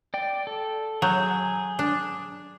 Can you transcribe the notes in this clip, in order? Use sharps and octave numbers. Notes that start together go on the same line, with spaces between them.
D5 G5
A4
F#3 G#4 G6
D4